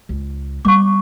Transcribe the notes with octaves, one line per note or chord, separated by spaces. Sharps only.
C#2
G3 B3 C#6 D6